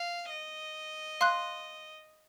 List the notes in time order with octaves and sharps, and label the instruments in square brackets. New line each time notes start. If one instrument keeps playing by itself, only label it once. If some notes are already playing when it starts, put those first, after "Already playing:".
Already playing: [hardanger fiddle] F5
D#5
[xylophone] F5 C6 F#6